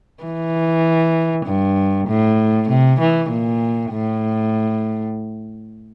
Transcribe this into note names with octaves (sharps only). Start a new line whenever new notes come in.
E3
G2
A2
C3
E3
A#2
A2